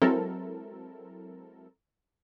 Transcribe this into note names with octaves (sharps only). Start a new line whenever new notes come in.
F#3 G#3 C4 E4 A4 A#4